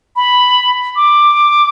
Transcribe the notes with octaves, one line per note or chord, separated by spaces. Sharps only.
B5
D6